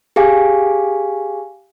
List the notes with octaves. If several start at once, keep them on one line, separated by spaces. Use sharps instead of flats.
G4 G#4 F5 G#5